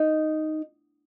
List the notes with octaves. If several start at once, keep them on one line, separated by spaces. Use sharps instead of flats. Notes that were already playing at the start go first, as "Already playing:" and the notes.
Already playing: D#4